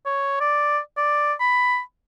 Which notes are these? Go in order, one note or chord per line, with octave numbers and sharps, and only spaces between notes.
C#5
D5
D5
B5